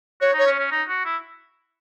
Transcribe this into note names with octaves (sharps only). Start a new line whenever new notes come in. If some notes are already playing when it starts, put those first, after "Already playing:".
F#4 C#5
D#4
C#5
C#4
C#4
D#4
F#4
E4